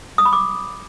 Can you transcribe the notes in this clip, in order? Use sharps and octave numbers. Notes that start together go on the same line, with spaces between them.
D#6
B5
D6